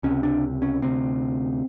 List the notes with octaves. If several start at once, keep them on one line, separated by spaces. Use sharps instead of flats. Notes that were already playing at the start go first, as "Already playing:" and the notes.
C#2 C3 C#4
D4
C#4
D2 C3 C4